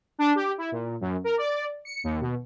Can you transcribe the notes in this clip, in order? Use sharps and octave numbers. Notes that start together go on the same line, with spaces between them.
D4
G4
E4
A#2
F#2
A#4
D5
C#7
D#2
B2